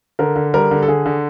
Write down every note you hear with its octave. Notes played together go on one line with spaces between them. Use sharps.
D3 A#4
D3
G3 A#4
D3
A4
D3 G#4
D3